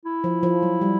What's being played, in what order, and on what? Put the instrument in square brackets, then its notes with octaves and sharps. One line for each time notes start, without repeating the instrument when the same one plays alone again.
[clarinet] E4
[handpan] F3
F3
F#3
G3